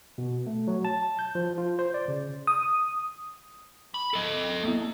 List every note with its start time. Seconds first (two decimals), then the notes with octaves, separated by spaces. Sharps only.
0.18 B2
0.47 A3
0.68 F#3
0.85 A5
1.19 G6
1.35 F3
1.58 F4
1.79 C5
1.94 D5
2.08 C#3
2.47 D#6
3.94 B5
4.14 A4 D#5
4.63 A#3 B3 E4